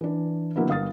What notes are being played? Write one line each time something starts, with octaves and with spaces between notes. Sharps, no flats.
E3 D4
D3 F#3 A#3 B3 E4
G1 F5 D#6 A6